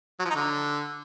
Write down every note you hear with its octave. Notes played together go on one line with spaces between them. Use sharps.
F#3
F3
D#4
D3